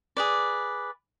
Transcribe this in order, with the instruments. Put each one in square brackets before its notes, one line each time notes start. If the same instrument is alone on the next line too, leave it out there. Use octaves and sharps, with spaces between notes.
[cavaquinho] G#4 B4 D5